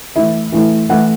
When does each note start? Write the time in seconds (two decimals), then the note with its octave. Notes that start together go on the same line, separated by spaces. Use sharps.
0.16 E3 A3 E4 E5
0.52 E3 A3 E4
0.89 E3 A3 E4 F#5